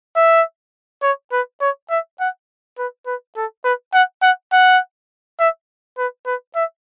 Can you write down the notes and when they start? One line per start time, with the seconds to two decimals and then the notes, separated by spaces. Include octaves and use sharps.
0.16 E5
1.03 C#5
1.32 B4
1.61 C#5
1.90 E5
2.20 F#5
2.78 B4
3.06 B4
3.36 A4
3.64 B4
3.93 F#5
4.22 F#5
4.52 F#5
5.39 E5
5.98 B4
6.26 B4
6.55 E5